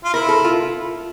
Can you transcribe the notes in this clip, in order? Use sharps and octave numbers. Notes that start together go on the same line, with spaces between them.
F4
E4 A#4
A4
F4